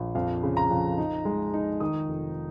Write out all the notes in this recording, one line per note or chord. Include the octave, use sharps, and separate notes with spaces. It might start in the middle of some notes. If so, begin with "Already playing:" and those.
Already playing: A#1
F2 F5
C#3
A#5
F2
D#4
G#3
D#4
D#3 D#6
F1